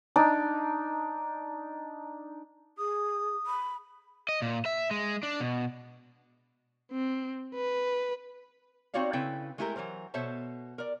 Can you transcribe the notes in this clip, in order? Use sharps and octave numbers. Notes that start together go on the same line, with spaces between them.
D4 D#4
G#4 D#6
B5
D#5
A#2
E5
G#3
D4
B2
C4
B4
C4 D#4 F#4 C#5 D5 F5
C#3 C4 E4 A4 B4 G5
G#3 A3 E4 G4 A4 A#4
E3 F#3 A#4 C5
B2 A4 C5 C#5 E5 A5
A#4 D5